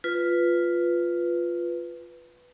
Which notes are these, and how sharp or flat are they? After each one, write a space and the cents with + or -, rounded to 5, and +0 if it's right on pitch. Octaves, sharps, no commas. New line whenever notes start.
F4 +0 B4 +0